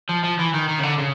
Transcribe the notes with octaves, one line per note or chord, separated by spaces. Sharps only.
F3
F3
E3
D#3
D#3
C#3
D3
C#3